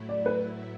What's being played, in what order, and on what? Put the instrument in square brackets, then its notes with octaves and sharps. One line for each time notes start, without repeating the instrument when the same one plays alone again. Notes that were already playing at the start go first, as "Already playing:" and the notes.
Already playing: [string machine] A2 F#3 A3 E4
[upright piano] D5
B4